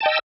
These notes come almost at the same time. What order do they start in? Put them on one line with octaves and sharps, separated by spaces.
A5 G5 D#5 E6